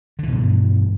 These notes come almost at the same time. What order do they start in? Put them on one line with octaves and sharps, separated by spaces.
D3 E3 B2 G2